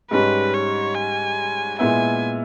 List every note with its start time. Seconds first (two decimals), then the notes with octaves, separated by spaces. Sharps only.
0.11 G#2 G3 C#4 B4
0.54 C#5
0.95 G#5
1.79 A#2 G#3 B3 E4 G#5